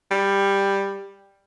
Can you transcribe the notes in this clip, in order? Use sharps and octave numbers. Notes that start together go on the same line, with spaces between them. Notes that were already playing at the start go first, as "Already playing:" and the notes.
G3